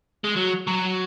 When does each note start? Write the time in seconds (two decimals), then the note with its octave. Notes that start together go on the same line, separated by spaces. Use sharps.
0.24 G#3
0.36 F#3
0.67 F#3